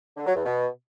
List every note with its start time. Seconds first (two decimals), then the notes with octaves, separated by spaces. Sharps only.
0.17 D3
0.26 F#3
0.35 E2
0.45 B2